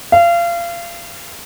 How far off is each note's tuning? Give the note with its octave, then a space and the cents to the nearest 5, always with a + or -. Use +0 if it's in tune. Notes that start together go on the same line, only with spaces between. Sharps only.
F5 -30